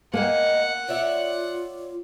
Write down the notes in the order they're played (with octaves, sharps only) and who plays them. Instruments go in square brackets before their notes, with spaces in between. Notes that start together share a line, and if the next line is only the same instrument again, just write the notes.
[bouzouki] G#3 C4 D#4 [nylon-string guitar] A#3 [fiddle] F#5
[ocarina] F4 [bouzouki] C#5 D5 E5